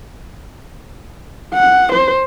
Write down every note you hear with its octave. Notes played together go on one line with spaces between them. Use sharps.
F#5
C5